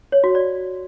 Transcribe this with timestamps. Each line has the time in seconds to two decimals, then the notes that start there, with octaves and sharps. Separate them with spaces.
0.12 C#5
0.24 F#4
0.35 D5